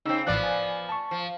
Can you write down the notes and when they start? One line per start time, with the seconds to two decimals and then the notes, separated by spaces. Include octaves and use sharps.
0.06 C#3 C4 D#4 E6
0.27 A1 F3 B3 D5 F#6
0.43 G#5
0.89 A5 C#6
1.11 F3